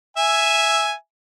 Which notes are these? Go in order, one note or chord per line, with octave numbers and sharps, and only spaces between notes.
E5 G#5